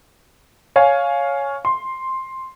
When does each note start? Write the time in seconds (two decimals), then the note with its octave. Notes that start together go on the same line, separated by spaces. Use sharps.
0.76 C#5 F5 G#5
1.65 C6